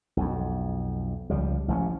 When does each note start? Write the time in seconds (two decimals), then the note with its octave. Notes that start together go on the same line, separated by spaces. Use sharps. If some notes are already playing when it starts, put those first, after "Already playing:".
0.17 B1 F2
1.30 C#2 F3 G3
1.68 A1 F3 G3 C#4